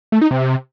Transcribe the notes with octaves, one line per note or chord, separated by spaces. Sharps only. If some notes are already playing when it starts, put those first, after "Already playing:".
A3
D#4
C3